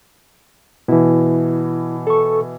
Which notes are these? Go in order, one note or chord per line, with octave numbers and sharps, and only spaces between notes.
B2 E3 E4
A4 C#6